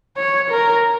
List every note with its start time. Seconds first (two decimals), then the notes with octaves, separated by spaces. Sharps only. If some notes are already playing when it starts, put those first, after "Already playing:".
0.17 C#5
0.50 A#4